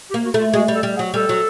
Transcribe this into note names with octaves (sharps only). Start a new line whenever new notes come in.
G4
A#3
F#4
A3 F4
G#3 F#4
G3
A4
G3
G#4
F#3
G3 A4
F#3